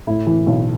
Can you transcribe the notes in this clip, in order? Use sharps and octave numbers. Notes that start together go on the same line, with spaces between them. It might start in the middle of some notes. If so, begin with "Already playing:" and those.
A2 E4
E3
B1